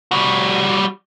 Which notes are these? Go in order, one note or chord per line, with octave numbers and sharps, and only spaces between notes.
G3 F#4